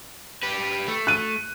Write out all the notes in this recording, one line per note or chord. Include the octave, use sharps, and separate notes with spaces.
G4 B4
A3
F#6 D#7